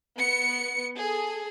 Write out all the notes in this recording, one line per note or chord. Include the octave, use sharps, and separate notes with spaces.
B3 C#7
G#4 A4